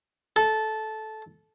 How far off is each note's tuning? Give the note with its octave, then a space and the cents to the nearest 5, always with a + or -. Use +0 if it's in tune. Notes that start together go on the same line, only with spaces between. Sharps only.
A4 -15